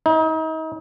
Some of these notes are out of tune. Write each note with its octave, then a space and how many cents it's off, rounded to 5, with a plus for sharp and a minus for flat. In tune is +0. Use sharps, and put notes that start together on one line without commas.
D#4 +35